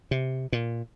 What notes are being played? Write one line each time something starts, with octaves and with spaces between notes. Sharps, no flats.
C3
A#2